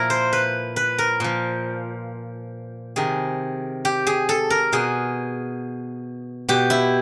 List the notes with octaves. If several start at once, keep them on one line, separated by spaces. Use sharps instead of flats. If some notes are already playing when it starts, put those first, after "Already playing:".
Already playing: A#2 F3 E4 A#4
C5
B4
B4
A#4
A#2 F3
C3 D#3 G#4
G4
G#4
A4
A#4
B2 G#4
B2 G4
E4